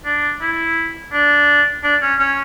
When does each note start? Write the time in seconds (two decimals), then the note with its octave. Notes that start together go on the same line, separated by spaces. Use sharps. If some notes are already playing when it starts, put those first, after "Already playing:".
0.05 D4
0.41 E4
1.13 D4
1.84 D4
2.02 C#4
2.20 C#4